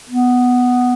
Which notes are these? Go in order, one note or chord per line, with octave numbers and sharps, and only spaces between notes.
B3